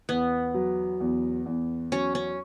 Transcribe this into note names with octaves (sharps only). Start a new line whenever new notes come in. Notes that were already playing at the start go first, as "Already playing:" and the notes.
E2 B3
F#3
E2
E2
F#3 C#4
C#4